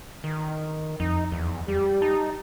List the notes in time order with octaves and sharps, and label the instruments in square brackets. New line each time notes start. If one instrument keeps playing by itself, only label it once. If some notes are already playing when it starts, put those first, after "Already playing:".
[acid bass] D#3
[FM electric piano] F2 [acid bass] D#4
[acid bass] E2
[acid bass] G3 [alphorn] G4
[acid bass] D#4 [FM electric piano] A5